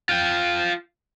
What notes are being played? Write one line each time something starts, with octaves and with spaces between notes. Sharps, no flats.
F4 G5